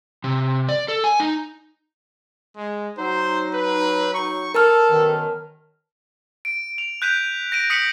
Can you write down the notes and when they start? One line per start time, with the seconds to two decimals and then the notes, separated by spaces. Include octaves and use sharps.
0.24 C3
0.69 D5
0.88 A4
1.04 G#5
1.20 D#4
2.56 G#3
2.98 F#3 D#4 C5
3.53 B4
4.14 C#6
4.54 A4 A#4 A5 F6
4.90 F#2 B2 D#3
6.45 D7
6.78 F7
7.02 F#6 G6 B6 D#7 F7
7.52 A#6 D7 D#7
7.70 D#6 B6 C#7 D#7 F#7